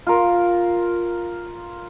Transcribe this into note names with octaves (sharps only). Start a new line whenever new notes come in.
F4 A#4